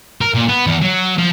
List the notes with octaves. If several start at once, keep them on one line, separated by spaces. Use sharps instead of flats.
A#4
A#2
B3
E2
F#3
F3